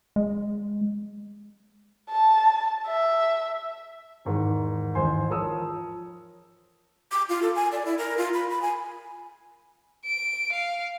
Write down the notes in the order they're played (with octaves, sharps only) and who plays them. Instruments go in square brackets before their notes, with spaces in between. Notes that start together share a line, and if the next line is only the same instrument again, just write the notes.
[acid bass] G#3
[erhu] A5
E5
[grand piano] E2 G#2 D#3
A1 D#2 G#2 C5 G#5 C6
F3 A#4 C#5 D#6 E6
[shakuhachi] D6
F4
A4
G#5
D5
E4
A#4
F4
B5
B5
G#5
[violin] D7
F5